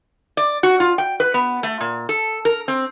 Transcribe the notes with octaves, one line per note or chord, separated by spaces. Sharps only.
D5
F#4
F4
G5
B4
B3
A3
A#2
A4
A#4
C4